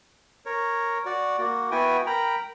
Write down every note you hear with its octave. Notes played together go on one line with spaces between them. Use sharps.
A#4 C#5
F#4 D5
A#3 F#4
B3 E4 F#4 G5 G#5
A#4 G5 A#5 B5